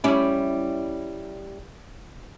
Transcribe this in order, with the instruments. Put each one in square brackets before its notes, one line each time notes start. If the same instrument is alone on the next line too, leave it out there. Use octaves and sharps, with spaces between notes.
[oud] G3 C#4 E4